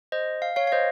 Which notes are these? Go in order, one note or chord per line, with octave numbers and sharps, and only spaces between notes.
C5 D#5
F5
C#5 F5
F5
C5 D#5